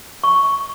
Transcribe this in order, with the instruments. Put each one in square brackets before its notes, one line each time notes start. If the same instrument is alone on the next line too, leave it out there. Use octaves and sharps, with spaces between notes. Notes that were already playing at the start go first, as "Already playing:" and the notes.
[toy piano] C#6